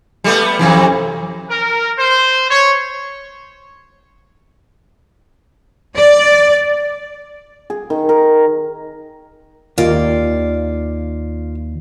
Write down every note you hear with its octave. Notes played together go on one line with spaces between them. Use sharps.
G3 A3 B3
F2 C3 E3
A#4
C5
C#5
D5
G#4
D#3
A#4
D#2 A#3 F4 D5